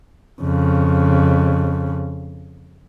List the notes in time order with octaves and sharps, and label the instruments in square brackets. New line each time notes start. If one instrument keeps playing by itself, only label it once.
[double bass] F2 C#3